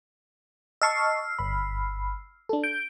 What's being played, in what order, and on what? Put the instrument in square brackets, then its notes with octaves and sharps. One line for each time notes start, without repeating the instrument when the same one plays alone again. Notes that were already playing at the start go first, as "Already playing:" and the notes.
[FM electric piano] D#5 A5 C#6 [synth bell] E6 F6 C7
[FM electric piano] G1 B5
D4 A4
[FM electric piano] G6 [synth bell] D7